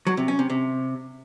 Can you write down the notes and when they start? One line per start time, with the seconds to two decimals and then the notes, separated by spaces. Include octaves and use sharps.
0.07 F#3
0.17 C3
0.28 C#4
0.39 C3
0.50 C3